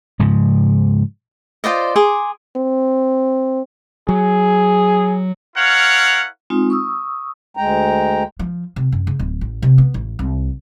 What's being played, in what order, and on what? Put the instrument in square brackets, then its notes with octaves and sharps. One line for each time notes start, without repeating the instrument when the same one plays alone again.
[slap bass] G#2 C#3 F3
[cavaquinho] F4 C5 D5 D#5
G#4 C6 D6
[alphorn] C4
[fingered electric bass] F#3 [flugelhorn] G#4
[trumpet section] E4 A#4 C#5 F5 F#5
[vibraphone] G#3 C4 D#4 F4
C#6 D#6 E6
[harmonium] D2 G#3 G5 A#5
[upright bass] F3
C3
F#2
C#3
D1
A1
C3
B3
A1
C2